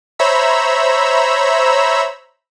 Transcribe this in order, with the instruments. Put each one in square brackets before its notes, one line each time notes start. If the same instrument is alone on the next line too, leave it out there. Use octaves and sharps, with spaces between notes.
[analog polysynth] C5 C#5 E5 A#5 B5 E6